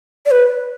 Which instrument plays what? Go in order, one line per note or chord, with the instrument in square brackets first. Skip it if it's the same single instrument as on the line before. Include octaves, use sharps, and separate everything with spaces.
[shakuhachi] D5
B4